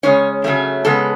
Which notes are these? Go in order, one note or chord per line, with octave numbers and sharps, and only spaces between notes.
C#3 G#3 C#4 C#5
C#3 F#3 A3 C#4
C#3 G#3 B3 A4